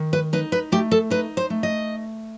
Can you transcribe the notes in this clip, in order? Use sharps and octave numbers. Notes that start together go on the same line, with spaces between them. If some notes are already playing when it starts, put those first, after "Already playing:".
Already playing: D#3
B4
D#4 B4
B4
A3 G4
A4
D#4 B4
C5
A3
D#5